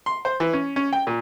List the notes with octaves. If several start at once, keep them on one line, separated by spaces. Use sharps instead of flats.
C6
C5
E3
C#4
C#4
G5
A#2